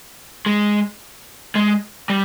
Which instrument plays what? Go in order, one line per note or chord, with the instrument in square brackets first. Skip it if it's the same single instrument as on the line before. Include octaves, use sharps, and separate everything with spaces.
[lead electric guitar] G#3
G#3
G3